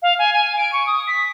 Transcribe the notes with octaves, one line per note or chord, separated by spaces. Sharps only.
F5
G#5
G#5
D7
C#6
D#6
B6